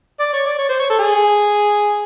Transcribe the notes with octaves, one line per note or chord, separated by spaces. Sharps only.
D5
C#5
D5
C#5
C5
C#5
A4
G#4